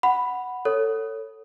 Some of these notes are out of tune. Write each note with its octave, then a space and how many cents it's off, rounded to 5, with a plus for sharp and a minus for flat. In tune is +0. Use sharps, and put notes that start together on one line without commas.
F#5 +0 B5 +0
A4 +20 C#5 +5